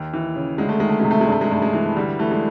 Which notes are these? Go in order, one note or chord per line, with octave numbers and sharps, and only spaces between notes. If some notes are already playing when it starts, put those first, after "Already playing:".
Already playing: D#2
E3
C#3
D2 G#3
A3
D#3 G#3
A3
C3 G#3
A3
G#3
G2 A3
G#3
G2 A3
G#3
E3
D2 G3
E3 A3
G#3